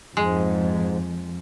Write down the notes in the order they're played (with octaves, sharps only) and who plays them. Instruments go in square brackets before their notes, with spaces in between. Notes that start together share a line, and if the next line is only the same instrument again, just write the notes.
[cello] F2 [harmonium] G#2 [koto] G#3